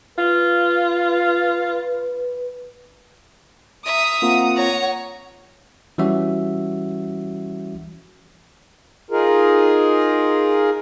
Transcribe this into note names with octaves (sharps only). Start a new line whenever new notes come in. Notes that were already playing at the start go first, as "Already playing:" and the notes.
F4 B4
E5 A#5 D#6
A#3 C4 F4 F#5
C#5 A#5
E3 G3 C#4 F#4 E5
D#4 F4 G#4 A#4